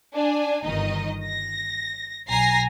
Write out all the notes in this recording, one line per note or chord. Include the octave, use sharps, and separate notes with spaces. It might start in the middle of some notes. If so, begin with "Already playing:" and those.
D4 G#5
G1 D#3 D#4 D#5
A#6
B1 G#5 A#5 A#6 C7